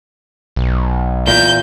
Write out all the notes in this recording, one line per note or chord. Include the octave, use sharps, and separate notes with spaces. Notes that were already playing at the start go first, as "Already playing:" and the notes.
B1
E2 A#2 G6